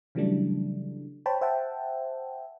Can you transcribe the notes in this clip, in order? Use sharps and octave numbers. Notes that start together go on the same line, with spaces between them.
C#3 E3 F#3 G3 A3 D4
C5 C#5 G5 A5 B5
C5 E5 F#5 G5 A5